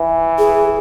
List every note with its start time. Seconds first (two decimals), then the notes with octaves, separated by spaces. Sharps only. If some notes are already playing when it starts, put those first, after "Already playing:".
Already playing: E3
0.39 G#4